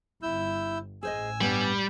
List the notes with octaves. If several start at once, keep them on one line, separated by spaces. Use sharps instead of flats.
G1 E4 E6 G6
A1 G#4 C5 D#5 G#5 E6
G2 G3 B3 C#4